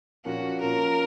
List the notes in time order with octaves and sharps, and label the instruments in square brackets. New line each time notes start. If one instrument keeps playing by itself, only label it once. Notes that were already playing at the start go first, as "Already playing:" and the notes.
[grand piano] A#2 F3 A#3 C#4 [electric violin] F#4
[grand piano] A#2 F3 A#3 C#4 [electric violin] A#4